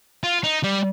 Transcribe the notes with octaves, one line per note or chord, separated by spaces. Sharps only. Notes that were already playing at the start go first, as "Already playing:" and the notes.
F4
D#4
G3